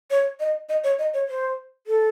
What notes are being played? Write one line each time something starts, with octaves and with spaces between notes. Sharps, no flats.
C#5
D#5
D#5
C#5
D#5
C#5
C5
A4